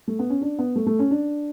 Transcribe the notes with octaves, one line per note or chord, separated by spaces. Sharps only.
A3
B3
C#4
D4
B3
A3
A3
C#4
D4